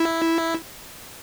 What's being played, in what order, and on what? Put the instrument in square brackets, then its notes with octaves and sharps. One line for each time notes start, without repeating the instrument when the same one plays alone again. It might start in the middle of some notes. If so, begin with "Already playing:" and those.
Already playing: [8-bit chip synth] E4